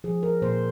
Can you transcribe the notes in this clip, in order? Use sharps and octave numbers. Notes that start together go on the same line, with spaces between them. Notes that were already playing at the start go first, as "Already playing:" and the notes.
F3 G#4
A#4
A#2 C5